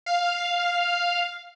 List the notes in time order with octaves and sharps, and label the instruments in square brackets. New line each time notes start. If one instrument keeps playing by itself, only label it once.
[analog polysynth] F5